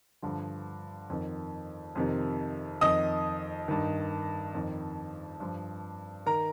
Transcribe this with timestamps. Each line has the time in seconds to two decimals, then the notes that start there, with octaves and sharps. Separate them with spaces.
0.22 G2 D3 F3
1.10 F2 D#3
1.95 F2 C3 D#3
2.81 F2 D#3 D#5 D#6
3.68 G2 D#3
4.54 F2 D#3
5.40 G2 F3
6.26 D#3 A#4 A#5